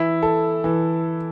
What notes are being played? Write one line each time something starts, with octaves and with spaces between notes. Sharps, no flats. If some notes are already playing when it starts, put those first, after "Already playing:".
Already playing: E3 E4
A4
E3